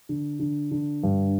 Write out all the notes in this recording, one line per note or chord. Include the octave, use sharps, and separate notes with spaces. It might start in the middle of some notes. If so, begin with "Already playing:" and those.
D3
D3
D3
G2